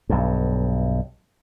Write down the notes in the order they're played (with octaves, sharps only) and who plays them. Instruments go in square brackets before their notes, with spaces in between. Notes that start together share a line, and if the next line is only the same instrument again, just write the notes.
[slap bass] B1 G2